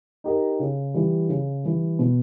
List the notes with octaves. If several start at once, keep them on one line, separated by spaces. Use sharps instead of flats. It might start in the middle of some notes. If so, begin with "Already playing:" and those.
D#4 G4 A#4
C#3
E3 G3
C#3
E3 G3
B2